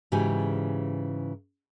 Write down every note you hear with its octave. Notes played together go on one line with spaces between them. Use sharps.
G#2 C#3 E3 F#4 G4 G#5